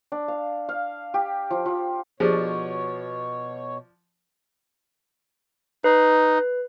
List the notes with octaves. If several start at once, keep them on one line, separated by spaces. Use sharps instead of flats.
D4
F5
F5
G4
F3
F3
B2 F3 D4 G4 G#4 C5 C#5
D#4 B4